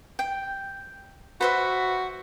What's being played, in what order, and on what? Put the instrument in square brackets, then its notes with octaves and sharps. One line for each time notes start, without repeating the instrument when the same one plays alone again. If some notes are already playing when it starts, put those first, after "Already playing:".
[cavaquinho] G5
[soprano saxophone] F#4 [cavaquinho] B4 C5 E5